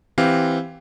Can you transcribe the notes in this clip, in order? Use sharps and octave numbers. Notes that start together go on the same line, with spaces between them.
E3 C4 G4 F5